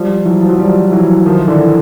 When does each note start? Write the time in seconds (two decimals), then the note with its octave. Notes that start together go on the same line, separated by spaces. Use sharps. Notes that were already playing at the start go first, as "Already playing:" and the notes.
Already playing: F3 G3
0.25 E3 F#3
0.41 F3
0.49 F#3
0.58 F3 G3
0.92 E3 F#3
1.26 D#3 F3
1.47 D3 E3